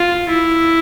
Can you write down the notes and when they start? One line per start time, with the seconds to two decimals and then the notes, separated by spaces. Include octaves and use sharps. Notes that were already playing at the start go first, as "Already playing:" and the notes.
Already playing: F4
0.29 E4